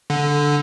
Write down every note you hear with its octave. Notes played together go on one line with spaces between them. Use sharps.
D3